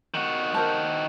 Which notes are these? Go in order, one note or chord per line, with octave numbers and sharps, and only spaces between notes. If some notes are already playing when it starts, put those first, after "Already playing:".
D#3 F#4
A#4 C5 A5